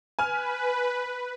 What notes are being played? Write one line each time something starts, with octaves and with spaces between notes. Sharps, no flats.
B4 G#5 F6